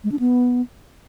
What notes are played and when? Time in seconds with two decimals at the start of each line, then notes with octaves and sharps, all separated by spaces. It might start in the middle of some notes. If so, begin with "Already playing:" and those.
0.04 G#3
0.12 D4
0.19 B3